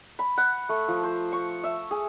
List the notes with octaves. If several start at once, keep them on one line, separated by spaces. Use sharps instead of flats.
B5
F#5
A3
F3
C5
C#6
E5
G#4